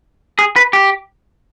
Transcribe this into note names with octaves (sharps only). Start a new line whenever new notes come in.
G#4
B4
G4